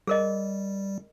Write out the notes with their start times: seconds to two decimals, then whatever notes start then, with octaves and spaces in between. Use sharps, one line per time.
0.07 G3 G#4 A#4 D#5